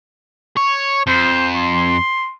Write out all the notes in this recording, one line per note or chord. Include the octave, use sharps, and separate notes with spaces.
C#5
F2 C5
C6